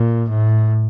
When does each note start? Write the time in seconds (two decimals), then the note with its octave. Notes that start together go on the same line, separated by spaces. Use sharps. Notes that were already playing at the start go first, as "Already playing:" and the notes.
Already playing: A#2
0.29 A2